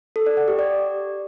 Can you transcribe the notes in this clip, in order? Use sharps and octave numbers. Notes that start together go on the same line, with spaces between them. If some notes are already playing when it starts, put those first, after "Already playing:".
A4
D5
F#5
G4
D5